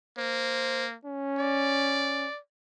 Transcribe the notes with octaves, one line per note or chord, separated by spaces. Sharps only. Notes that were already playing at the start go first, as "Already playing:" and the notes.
A#3 C5
C#4
D5